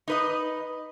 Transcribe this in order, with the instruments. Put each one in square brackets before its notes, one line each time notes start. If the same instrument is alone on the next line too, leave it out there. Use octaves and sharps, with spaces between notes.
[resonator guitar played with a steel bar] D#4 B4 D#5